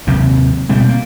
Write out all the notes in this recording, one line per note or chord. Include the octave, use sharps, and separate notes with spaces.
D#2 C3 F#3 C4
B2 G3 G#3 C4
A#3